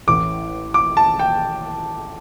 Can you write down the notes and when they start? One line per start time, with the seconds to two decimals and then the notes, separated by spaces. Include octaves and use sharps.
0.07 A1 A2 E3 D6
0.74 D6
0.97 A5
1.19 G5